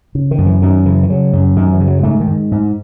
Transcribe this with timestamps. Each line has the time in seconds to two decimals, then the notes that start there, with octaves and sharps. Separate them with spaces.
0.15 C#3
0.31 D#3
0.38 F#2
0.46 E3
0.62 F#2 D#3
0.85 C#3 E3
1.03 E3
1.09 C#3 F#3
1.33 F#2
1.56 F#2 D#3
1.73 E3
1.80 C#3
1.87 F#3
2.03 G#2 A3
2.20 D#3
2.27 G#2
2.52 G#2